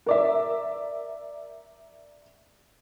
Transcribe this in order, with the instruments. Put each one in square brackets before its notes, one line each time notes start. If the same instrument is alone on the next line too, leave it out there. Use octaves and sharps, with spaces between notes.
[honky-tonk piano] A#4 D5 E5